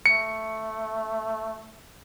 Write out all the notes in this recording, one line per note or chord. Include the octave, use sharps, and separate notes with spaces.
A3 C#7